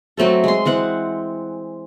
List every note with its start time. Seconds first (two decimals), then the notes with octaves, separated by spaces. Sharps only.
0.17 F#3 A3 C4 A4
0.44 G#3 C6
0.65 E3 C4 F#5